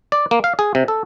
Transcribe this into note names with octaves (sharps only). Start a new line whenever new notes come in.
D5
A#3
F5
G#4
C3
A4